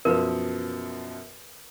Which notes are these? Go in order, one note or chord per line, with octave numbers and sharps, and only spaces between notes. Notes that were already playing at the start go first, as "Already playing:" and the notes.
F#2 B2 F3 A#4 B4